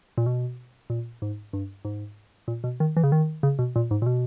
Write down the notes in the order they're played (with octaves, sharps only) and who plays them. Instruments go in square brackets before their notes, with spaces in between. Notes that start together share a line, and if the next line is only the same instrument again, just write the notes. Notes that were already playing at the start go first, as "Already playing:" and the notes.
[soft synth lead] A#2
B2
A#2
G#2
G2
G#2
A#2
B2
D#3
E3
C#3
D#3
C#3
B2
A#2
G#2
A#2
B2